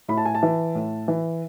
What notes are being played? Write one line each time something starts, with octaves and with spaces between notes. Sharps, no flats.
A2 B5
A5
G#5
A5
E3
A2
E3